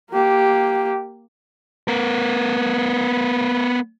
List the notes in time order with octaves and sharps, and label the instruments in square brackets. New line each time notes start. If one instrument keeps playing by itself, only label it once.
[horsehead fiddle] A#3 G4
[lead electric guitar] B3 A#4